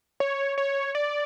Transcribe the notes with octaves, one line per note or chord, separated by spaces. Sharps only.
C#5
C#5
D5